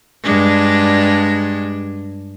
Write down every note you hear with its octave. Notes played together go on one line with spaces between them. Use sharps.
G2 G#3 D4